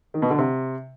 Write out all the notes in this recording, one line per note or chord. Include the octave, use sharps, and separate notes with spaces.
D#3
B2
D3
C3